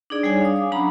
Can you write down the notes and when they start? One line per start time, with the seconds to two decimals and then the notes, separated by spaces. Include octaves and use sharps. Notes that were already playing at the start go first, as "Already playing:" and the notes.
0.10 D4 D#4 G#4 D5
0.23 G3 G#4 C#5 G#5
0.41 F5 D#6
0.56 D6
0.72 F#3 C#4 D4 A#5 B5 D6